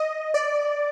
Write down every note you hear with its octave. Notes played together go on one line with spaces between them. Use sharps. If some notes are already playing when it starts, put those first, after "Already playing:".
Already playing: D#5
D5